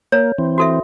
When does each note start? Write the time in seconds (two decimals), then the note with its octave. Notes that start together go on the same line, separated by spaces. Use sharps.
0.12 A#3 C#5
0.38 E3 C4
0.58 F#4 A4 E5